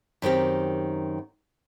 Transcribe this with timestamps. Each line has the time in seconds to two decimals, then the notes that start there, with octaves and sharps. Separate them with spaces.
0.22 F#2 D#3 C4 G4